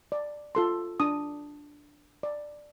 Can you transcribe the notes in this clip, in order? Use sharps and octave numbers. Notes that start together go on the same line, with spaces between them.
D5
F4 A4 C6
D4 D#6
D5